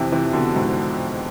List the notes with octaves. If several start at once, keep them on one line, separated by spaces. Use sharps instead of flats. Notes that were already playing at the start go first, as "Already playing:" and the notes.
Already playing: F2 C3 E3
C3 E3
B2 D3
G#2 B2